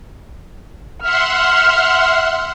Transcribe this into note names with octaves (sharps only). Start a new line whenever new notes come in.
E5 F#5 C6 F6